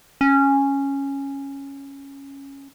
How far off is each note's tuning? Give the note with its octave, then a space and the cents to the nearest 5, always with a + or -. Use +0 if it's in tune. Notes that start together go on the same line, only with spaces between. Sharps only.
C#4 -5